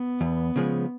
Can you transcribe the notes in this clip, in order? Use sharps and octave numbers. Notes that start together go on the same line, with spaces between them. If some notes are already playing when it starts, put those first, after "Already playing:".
Already playing: B3
E2
C#3 F3 G#3